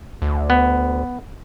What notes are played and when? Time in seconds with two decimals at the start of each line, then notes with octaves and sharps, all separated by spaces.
0.22 D2
0.50 B3